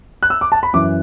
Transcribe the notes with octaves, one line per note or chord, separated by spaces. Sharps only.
F#6
E6
D6
A5
B5
F#2 E3 D6